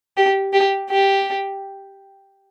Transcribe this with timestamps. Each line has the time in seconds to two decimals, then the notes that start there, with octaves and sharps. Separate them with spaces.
0.17 G4
0.53 G4
0.90 G4